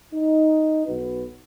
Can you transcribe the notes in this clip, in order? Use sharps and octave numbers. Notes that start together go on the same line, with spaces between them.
D#4
B1 F#4 B4